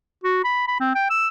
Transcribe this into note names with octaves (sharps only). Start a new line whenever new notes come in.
F#4
B5
B5
C4
G5
E6